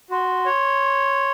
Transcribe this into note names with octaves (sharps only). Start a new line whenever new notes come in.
F#4 C6
C#5